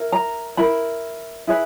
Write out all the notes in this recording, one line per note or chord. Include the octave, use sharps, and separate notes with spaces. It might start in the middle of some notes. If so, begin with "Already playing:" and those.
Already playing: E4 A#4
A#5
E4 A#4 B5
E4 G#4 B4